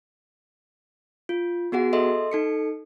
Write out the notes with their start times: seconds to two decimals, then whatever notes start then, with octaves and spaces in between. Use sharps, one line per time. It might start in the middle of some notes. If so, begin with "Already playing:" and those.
1.29 F4
1.72 B3 F#4 G#4 F#5
1.93 A4 D#5 E5 C6
2.32 D#4 A4 C#7